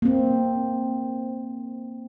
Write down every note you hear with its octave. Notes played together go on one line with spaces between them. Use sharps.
A#3 C4